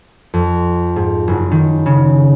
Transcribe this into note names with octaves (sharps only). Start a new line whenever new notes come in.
F2
G#2
F#1
D#3
C#3